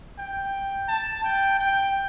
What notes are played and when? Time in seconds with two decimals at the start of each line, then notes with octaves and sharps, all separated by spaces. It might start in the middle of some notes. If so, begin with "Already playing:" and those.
0.18 G5
0.88 A5
1.24 G5
1.59 G5